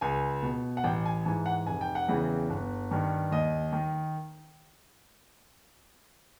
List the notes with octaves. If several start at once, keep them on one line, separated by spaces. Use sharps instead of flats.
C#2 G#5
B2
F#5
A1 G5
G#5
G#2 E3 G#5
F#5
F1 G#5
G5
F#5
E2 C#3 E3 G5
G1
G2 D#3
D#2 D#5
D#3